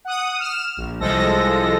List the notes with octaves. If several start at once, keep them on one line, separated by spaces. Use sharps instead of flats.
F#5 D#6
F6 E7
A#1
C2 F3 G#3 A4 A#6